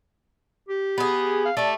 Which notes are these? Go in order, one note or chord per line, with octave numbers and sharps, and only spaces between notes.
G4
B3 G#4
F5
A3 G4 D5